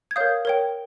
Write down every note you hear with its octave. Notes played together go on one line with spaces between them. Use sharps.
G#6
A#4 C#5 F5 D#6 G6
A#4 C#5 G5